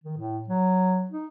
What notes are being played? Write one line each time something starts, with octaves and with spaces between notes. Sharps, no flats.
D#3
A2
F#3
D#4